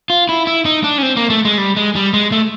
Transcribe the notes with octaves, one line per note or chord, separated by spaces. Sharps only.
F4
E4
E4
D#4
D4
C#4
C4
A#3
A3
G#3
G3
G#3
G3
G#3
A3